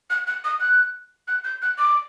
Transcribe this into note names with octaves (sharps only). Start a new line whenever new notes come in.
F#6
F#6
D#6
F#6
F#6
G6
F#6
D6